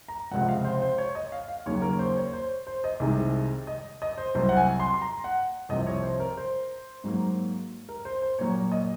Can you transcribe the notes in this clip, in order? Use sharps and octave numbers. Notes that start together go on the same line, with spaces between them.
A#5
C#2 C3 F3 F#5
F5
C5
C5
C#5
D#5
F5
F5
D#2 C#3 F#3 A#3 C#5
A#4
C5
C#5
C5
C5
D#5
C2 C3 D#3 G#3
D#5
D#5
C5
C2 C3 F#3 C5
F#5
G#5
C6
C6
A#5
F#5
C2 C3 F3 D#5
C#5
C5
A#4
C5
G#2 F#3 A#3
A#4
C5
C5
A#2 F#3 A#3 C#5
D#5